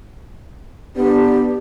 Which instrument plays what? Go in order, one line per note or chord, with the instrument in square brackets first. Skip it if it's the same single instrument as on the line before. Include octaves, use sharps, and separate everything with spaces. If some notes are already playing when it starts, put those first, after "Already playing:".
[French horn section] B3 D4 [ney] G4